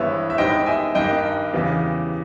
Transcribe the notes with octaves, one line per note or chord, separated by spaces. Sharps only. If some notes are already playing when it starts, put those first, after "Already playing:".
Already playing: G#1 G2 E3 G#3 B3 C#5 E5
E5
G#1 G#2 D#3 G3 B3 D#5 G5
E5 G#5
G2 D#3 A#3 D#5 G5
E2 C#3 E3 G3 B3